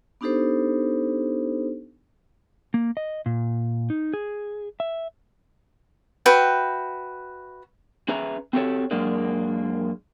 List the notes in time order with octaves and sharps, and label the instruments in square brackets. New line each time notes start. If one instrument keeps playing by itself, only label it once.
[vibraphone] B3 D4 D#4 G4 A4 C5
[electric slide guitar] A#3
D#5
A#2
D#4
G#4
E5
[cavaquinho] F#4 B4 E5 G5
[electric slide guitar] C#4 G#4 B4 E5 A#5
C4 F#4 G4 A4 C#5
F#2 G#3 A#3 D4